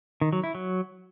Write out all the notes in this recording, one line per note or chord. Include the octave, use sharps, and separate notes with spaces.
D#3
F#3
E4
F#3